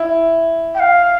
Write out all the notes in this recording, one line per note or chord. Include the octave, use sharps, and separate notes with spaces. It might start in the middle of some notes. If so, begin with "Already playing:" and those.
Already playing: E4
G5
F5